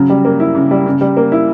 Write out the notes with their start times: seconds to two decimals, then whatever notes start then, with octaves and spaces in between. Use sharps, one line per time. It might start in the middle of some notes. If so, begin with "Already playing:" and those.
Already playing: C#3 F#3
0.10 G3
0.25 A#3
0.40 E4
0.55 C#3
0.71 G3
0.86 C#3
1.01 G3
1.17 A#3
1.32 E4